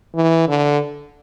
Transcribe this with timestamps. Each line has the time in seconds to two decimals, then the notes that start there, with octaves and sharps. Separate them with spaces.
0.15 E3
0.48 D3